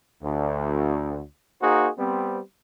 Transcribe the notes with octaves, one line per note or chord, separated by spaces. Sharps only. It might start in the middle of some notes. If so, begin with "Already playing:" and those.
D2
A#3 D#4 F#4 G#4 C5
G3 B3 C4